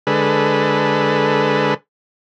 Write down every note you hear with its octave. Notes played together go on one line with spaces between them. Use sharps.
D3 G#3 A4 B4